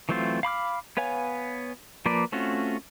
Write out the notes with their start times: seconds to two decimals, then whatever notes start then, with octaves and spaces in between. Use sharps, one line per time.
0.09 E3 F#3 A3 C4 F4
0.43 F5 B5 D6 F6
0.97 B3 B4 C#5 F5 G#5
2.06 F3 A#3 B4 D5
2.32 A3 C4 C#4 F4 F#4